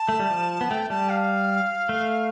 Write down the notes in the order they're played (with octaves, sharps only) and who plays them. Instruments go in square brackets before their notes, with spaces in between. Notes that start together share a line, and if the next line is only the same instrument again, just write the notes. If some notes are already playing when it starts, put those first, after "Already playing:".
Already playing: [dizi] A5
[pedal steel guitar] A3
G3
F3
B3
[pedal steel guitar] A3 [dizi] G5
[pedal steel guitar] G3 [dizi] A5
[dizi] F5
[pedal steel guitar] A3